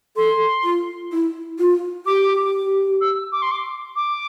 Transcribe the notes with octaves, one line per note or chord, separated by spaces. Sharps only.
A4 C6
F4
E4
F4
G4 D6
E6
D6
C6
D6
D6